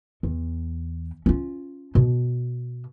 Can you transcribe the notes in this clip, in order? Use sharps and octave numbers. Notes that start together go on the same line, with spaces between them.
E2
C#4 F4
B2